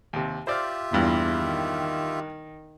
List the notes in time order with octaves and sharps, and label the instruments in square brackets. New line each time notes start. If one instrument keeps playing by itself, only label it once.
[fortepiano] D#2 C3
[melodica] F4 G4 E5 [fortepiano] C5 D5 F6
[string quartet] E2 [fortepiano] G2 A#2
[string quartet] D#3